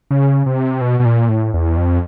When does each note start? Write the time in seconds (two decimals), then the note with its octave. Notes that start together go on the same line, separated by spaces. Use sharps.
0.11 C#3
0.46 C3
0.81 B2
1.00 B2
1.05 A#2
1.29 A2
1.54 E2
1.77 F2